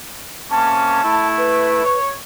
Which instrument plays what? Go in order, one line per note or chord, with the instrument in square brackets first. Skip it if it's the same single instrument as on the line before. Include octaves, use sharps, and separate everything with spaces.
[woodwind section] C3 A#3 C#4 [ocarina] A5
[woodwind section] A3 E4
[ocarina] B4
[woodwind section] C#5